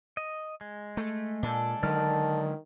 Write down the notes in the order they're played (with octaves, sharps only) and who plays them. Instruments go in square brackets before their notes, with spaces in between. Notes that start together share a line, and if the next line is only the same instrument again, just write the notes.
[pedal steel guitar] D#5
G#3
[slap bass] A3
[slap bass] A#2 [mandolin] D4 A4
[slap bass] D3 F#3 G#3 [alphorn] D#3 [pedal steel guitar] D5 F6